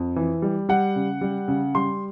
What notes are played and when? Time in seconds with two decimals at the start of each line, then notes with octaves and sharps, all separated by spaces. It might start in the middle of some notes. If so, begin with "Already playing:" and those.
Already playing: F2
0.16 E3
0.42 G3
0.69 G3 F#5
0.96 C#3
1.21 G3
1.48 C#3
1.75 G3 C6